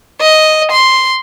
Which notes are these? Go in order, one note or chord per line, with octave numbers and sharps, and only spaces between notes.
D#5
C6